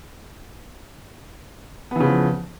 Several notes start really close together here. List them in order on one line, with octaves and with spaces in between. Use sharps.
B3 E3 C#3 F3